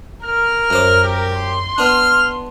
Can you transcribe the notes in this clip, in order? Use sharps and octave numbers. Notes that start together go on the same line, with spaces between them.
A#4 F6
F#2 C5 D6
G4
C6
B3 D4 F6